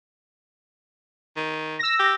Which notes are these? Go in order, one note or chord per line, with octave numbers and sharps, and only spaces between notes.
D#3
E6 A#6
G4